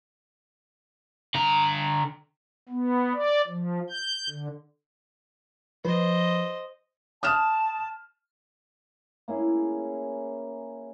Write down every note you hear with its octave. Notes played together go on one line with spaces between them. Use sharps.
D3 A#5
B3
D5
F3
G6
D3
F3 B4 C5 D#5
A5 D#6 F6 E7
A#3 C#4 E4 G#4